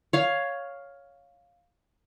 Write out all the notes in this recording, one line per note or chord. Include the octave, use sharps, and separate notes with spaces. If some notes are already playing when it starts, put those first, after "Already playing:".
C#5 F5